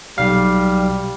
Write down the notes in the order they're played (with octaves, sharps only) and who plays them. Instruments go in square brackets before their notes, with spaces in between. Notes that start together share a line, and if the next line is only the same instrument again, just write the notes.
[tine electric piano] B1 F5 [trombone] G3